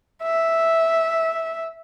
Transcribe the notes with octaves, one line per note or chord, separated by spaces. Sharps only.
E5